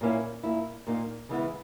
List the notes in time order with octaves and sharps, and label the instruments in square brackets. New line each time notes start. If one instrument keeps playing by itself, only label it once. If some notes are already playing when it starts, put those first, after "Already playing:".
[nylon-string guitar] A#2 A#3 C#4 E4
A#2 A#3 E4
A#2 A#3 D#4
C#3 E3 G#3 B3 E4